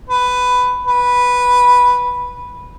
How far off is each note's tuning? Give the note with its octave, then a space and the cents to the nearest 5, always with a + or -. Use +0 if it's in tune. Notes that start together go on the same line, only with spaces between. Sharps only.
B4 +10
B4 -5